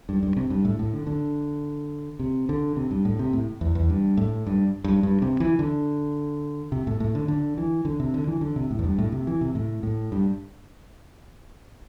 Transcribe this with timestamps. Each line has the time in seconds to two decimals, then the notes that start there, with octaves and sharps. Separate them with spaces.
0.09 G2
0.23 G2
0.37 C3
0.50 G2
0.65 A2
0.79 A2
0.94 D3
1.07 D3
2.20 C3
2.49 D3
2.76 C3
2.91 G2
3.05 A2
3.19 C3
3.33 A2
3.61 E2
3.75 E2
3.90 G2
4.17 A2
4.47 G2
4.84 G2
5.03 G2
5.22 C3
5.40 E3
5.59 D3
6.72 C3
6.87 A2
7.00 A2
7.15 D3
7.28 D3
7.58 E3
7.85 D3
8.00 C3
8.14 D3
8.27 E3
8.41 D3
8.56 C3
8.71 A2
8.79 E2
8.84 G2
8.98 A2
9.12 C3
9.27 E3
9.41 C3
9.55 A2
9.83 A2
10.12 G2